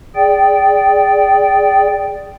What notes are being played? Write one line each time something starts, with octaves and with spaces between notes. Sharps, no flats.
G#4 D5 G5